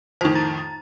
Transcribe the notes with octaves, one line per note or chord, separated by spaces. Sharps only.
F2 A2 D#3 D#4 C5
A#5 A6